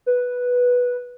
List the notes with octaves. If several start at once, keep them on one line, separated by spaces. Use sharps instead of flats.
B4